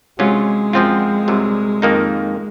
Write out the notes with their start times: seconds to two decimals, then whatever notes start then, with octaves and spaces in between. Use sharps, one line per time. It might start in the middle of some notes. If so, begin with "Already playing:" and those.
0.19 C3 F#3 G#3 C#4 F4
0.73 F#2 F3 C4 F4
1.28 C2 C3 F#3
1.82 F2 D#3 A#3 D#4